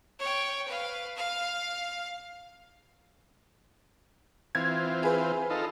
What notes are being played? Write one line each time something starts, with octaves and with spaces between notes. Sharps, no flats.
C#5 G5
B4 F5
F5
E3 C4 F4 G#6
G#4 B4
D#4 F4 A4